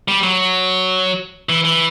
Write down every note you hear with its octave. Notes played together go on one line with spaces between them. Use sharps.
G3
F#3
E3
E3